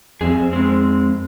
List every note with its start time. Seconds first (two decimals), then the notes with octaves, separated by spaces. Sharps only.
0.21 F2 C4 G#4
0.53 G#3 C4